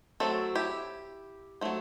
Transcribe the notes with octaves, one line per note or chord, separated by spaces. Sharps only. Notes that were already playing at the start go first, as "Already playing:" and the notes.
F#3 A3 C4 F#4 A4
E4 G4
F#3 A3 C4